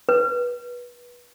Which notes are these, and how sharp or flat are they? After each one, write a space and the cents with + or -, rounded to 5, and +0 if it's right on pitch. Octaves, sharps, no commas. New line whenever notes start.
B4 -25